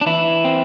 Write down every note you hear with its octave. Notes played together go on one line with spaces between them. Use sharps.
D4
E3 E4
C4